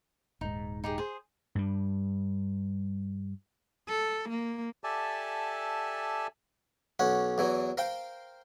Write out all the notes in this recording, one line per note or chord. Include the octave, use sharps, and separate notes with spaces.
D#1 G#2 D#4
D#4 G4 G#4
G#4 C5
G2 G3
A4
A#3
G4 A4 D5 E5 G#5 A5
B1 C#4 F#5
E2 E3 F#3
A#4 C5 F5 G5